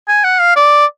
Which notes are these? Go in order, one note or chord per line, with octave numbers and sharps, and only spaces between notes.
G#5
F#5
F5
D5